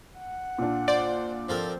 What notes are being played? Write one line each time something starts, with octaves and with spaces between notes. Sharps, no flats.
F#5
A#2 D4
C5 D5
F3 C4 A4 A#4